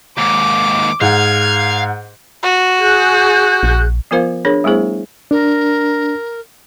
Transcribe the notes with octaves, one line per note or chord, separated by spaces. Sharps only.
D#2 G#2 D6
G#2 F5 F#5 G#6
F#4
G#4 F#6 G6
A#1
F3 B3 F4 A#4 C5 F5
D4 G#4 A#4 C#5
G3 A3 B3 E4 G#4 C5
D4 A#4